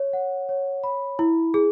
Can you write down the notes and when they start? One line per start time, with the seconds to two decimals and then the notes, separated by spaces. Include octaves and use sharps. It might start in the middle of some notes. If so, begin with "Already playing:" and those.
Already playing: C#5
0.13 F#5
0.49 C#5
0.84 B5
1.19 E4
1.54 G#4